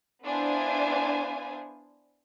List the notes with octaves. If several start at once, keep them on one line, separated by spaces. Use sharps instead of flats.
B3 D4 E4 C5 F5 G#5